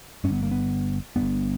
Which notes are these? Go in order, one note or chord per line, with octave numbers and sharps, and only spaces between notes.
G1 G2 B3 C#4
A#3
B3
G1 G2 B3